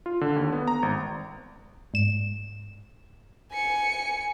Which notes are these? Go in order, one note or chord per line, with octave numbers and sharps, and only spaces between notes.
F4
D3
D#2
B3
A#5
G#1
G#2 E7
G#5 C#7